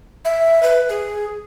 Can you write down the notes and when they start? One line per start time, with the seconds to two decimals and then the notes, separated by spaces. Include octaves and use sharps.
0.25 E5
0.63 B4
0.89 G#4